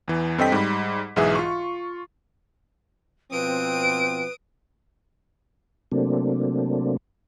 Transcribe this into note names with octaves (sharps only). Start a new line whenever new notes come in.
E2 E3
G2 C4 A4 D#5 G5 B6
G#2 G3 B5
B1 G#2 E3 G#4 E5
F4 C#6
B2 F3 C4 B4 D#6 D7
C3 F#3 A3 A#3 C4 D4